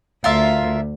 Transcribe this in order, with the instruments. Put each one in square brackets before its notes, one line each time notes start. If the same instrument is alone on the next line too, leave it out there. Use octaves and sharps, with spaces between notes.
[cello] D2 [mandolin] F4 A#4 E5